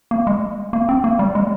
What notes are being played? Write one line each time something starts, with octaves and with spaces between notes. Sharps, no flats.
A#3
G#3
A#3
C4
A#3
G3
G#3